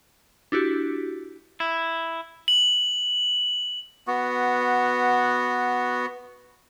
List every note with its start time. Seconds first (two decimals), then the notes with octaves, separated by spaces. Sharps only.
0.52 D4 E4 F#4 G4
1.60 E4
2.48 F#7
4.07 B3 F#4